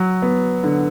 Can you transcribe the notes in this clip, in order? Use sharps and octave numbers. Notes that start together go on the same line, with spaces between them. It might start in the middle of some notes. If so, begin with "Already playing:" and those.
Already playing: F#3
B3
D3